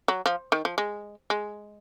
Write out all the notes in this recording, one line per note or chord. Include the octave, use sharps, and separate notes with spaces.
F#3
F3
D#3
F3
G#3
G#3